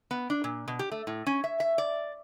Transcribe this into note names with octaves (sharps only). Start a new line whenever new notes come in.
B3
D4
A#2
B2
G4
A3
A2
C#4
E5
E5
D5